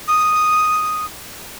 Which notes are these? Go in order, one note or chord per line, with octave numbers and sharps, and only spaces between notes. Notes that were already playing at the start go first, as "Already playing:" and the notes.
D#6